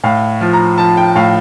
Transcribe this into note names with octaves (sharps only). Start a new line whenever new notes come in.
A2 F5
F3
A#5
F3 A5
G5
A2 F5